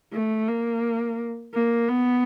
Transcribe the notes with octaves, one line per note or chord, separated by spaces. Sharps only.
A3
A#3
A#3
B3